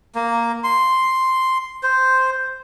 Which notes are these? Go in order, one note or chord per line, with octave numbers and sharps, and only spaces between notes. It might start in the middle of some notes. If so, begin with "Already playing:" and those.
A#3
C6
C5